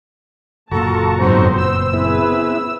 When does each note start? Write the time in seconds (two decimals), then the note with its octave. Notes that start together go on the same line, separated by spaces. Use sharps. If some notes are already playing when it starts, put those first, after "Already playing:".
0.71 F#1 A#2 F4 F#4 A4 A5 A#5 C#6
1.21 F2 G#2 F#3 B3 C4 C5
1.57 E6
1.93 B3 C4 E4 G#4 B4